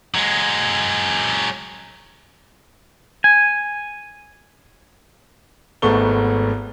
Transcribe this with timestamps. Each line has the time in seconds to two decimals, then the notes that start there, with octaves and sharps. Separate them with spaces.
0.15 F#3 G#3
3.24 G#5
5.82 G#1 G#2 A3 B3 C#6 G7